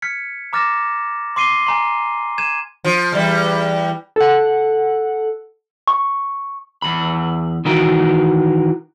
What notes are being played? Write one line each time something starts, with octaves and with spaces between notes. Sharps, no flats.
F6 G#6 B6 C#7
A#5 D6 F6 A6 A#6 E7
C6 D6 C7 D#7 G7
G#5 A#5 C6
G#6 D#7 E7
F3
E2 G3
A4 F#5
C#6
E2 B5
D#3 E3 F#4 A#4